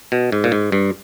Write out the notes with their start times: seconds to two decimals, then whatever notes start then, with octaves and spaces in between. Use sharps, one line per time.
0.12 B2
0.32 G#2
0.44 A#2
0.52 G#2
0.72 G2